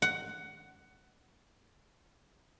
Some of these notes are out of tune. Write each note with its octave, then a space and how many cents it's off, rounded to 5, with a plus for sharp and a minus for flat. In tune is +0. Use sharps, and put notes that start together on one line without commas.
F#5 +15